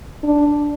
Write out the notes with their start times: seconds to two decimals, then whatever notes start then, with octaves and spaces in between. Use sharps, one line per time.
0.23 D4